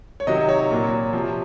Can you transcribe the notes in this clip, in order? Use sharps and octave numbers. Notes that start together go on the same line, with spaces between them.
C#5
C3 D#3 F#3 D#5
C#5
A#2 F#3
C3 F3